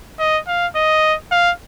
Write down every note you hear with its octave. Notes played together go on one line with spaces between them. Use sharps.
D#5
F5
D#5
F5